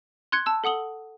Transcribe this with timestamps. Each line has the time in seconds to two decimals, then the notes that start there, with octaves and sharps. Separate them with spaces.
0.32 C6 F#6 G#6 C#7
0.46 A5 E6
0.64 A4 F#5 D#6 F#7 G7